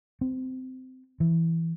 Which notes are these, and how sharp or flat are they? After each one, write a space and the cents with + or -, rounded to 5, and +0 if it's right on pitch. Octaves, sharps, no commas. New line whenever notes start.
C4 -20
E3 +0